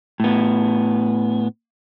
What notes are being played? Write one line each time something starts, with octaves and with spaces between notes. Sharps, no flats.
A2 B3